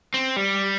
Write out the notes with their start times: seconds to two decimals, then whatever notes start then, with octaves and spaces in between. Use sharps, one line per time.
0.14 C4
0.36 G3